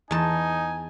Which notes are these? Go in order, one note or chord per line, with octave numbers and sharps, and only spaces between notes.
E2 D#4 G#5 A5